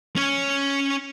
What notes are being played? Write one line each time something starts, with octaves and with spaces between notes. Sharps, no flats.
C#4 C#5